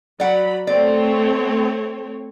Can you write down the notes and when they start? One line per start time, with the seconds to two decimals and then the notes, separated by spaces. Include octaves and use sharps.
0.20 F#3 D5 F#5 B5
0.67 A3 C4 C#5 D5